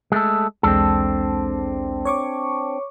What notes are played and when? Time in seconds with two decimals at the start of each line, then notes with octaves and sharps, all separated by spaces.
0.12 G#3 A3 A4
0.63 B1 E2 G#3 C4 D4 A4
2.05 C#5 C#6 D6